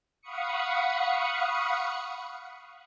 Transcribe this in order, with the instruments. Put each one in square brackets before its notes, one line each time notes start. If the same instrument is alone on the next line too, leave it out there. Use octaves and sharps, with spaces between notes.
[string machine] F5 F#5 B5 C#6 D#6 C#7